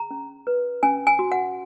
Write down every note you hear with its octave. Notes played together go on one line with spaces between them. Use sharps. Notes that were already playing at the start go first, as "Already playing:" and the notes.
Already playing: G#4 A#5
C#4
B4
C#4 G#5
G#5
F#4
F#5